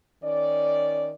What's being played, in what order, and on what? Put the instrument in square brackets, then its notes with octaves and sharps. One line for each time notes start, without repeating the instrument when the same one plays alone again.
[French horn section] D#3 C#4 D5